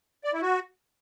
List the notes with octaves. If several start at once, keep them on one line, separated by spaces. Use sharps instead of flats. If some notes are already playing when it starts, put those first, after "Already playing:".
D5
E4
F#4